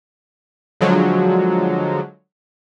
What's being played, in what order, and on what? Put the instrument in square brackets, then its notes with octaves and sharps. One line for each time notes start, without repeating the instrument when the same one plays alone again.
[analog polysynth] D3 F3 F#3 G#3